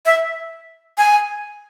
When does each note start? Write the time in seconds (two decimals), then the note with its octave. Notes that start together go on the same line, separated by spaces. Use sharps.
0.06 E5
0.98 G#5